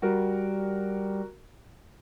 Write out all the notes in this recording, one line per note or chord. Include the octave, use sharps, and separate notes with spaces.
G3 F#4 A#4